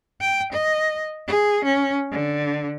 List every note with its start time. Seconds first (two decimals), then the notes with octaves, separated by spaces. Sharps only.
0.21 G5
0.52 D#5
1.27 G#4
1.64 C#4
2.12 D3